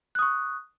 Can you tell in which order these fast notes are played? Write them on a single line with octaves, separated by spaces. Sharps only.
F#6 D#6 C#6